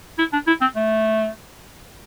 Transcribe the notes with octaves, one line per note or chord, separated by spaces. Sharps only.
E4
D4
E4
C4
A3